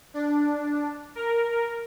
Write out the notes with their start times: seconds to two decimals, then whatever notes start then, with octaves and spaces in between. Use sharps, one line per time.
0.14 D4
1.15 A#4